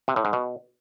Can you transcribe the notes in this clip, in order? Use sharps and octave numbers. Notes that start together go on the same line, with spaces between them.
C3
A2
G#2
B2